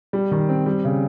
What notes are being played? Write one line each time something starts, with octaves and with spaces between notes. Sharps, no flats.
G3
D#3
C4
G3
C#3